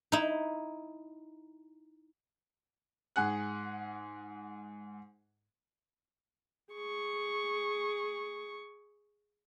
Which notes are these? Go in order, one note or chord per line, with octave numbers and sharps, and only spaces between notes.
D#4 E4
G#2 G#4 F#5 F#6
G#4 C#6